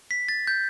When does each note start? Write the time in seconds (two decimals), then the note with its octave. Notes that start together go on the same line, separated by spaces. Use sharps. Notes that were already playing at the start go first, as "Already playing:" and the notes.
0.11 B6
0.29 A6
0.47 G6